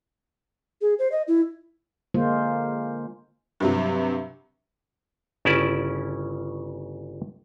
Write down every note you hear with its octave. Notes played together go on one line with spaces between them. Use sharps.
G#4
C5
D#5
E4
D3 G#3 A#3 F4 C5
G2 C3 F#3
G1 C#3 C#4 E4 D5 A5